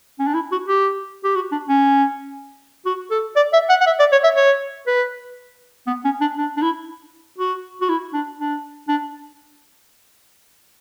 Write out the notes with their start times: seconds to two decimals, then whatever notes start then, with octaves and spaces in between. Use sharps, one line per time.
0.19 C#4
0.27 D4
0.34 E4
0.52 F#4
0.68 G4
1.24 G4
1.36 F#4
1.52 D4
1.69 C#4
2.86 F#4
3.11 A4
3.36 D5
3.53 E5
3.69 F#5
3.81 F#5
3.87 E5
3.99 D5
4.12 C#5
4.24 E5
4.36 C#5
4.87 B4
5.87 B3
6.05 C#4
6.21 D4
6.38 D4
6.57 D4
6.62 E4
7.39 F#4
7.81 F#4
7.89 E4
8.13 D4
8.39 D4
8.89 D4